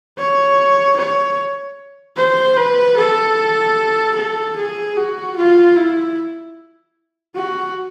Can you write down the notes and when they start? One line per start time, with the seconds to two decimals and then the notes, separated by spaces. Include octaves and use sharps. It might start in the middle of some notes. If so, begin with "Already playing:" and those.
0.18 C#5
0.97 C#5
2.16 C5
2.57 B4
2.97 A4
4.15 A4
4.56 G#4
4.96 F#4
5.36 F4
5.76 E4
7.35 F#4